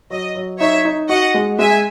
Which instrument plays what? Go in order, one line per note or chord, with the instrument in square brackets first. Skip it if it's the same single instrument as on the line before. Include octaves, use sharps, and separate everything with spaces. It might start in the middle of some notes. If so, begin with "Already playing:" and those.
[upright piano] F#3 [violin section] D#5
[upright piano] F#3
[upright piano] D#4 [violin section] C#5 E5
[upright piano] D#4
[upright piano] F#4 [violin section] D#5 F#5
[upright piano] G#3
[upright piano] G#3 [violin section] E5 G#5